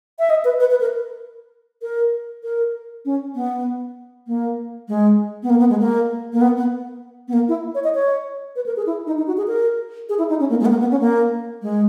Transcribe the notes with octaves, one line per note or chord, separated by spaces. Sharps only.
E5
D#5
B4
B4
B4
A#4
A#4
A#4
C#4
B3
A#3
G#3
B3
A#3
B3
G#3
A#3
A#3
B3
B3
B3
A#3
E4
C#5
D#5
C#5
B4
A#4
G#4
E4
D#4
D#4
F#4
G#4
A#4
G#4
E4
D#4
C#4
A#3
G#3
B3
A#3
B3
C#4
A#3
G#3